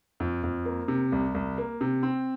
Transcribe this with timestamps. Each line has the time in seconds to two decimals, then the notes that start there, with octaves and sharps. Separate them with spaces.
0.20 F2
0.43 F2
0.66 A#3
0.88 C3
1.12 C2
1.34 C2
1.58 A#3
1.81 C3
2.03 C4